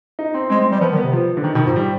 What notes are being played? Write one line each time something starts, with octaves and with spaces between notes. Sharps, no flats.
D#4
C4
G#3 C4
G#3
G3
F3 B3
D#3
B3
C3
F3
D3
D#3
B2 D#3
G#2 F3
G3